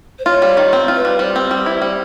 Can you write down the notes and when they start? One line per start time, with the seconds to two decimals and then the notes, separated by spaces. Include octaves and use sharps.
0.19 C5
0.26 F4 C#5
0.42 G3
0.57 D#3
0.73 C4
0.88 F4
0.96 B4
1.05 G3
1.19 G3 C5
1.36 C4
1.51 G3
1.66 E4
1.82 G3